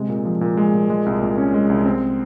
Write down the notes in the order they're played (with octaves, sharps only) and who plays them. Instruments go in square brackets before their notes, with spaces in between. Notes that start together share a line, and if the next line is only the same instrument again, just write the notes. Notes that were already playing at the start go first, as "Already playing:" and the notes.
Already playing: [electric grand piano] C3 G#3
A#2
F3
A#2
G#3
A#2
G#3
C2
A#2
C#4
G#3
C2
C4